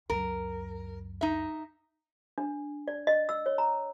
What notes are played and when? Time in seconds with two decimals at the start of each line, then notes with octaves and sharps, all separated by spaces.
0.10 C#2 F#2 A#4
1.21 D#4 E5
2.38 D4
2.88 D5
3.07 D#5
3.29 E6
3.46 C#5
3.58 A#5